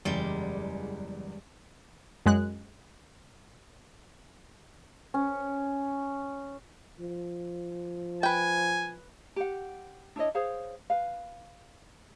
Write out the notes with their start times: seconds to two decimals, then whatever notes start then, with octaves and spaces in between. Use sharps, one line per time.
0.05 F#1 E2 G3 G#3
2.26 F#2 G#3 F#6
5.14 C#4
6.99 F3
8.23 B4 G5 G#5
9.36 G4 F#5
10.16 D4 E4 C#5 D#5
10.35 G#4 C5 C#5 F5
10.90 B4 F5